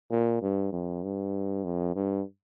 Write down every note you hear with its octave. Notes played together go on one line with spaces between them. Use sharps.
A#2
G2
F2
G2
F2
G2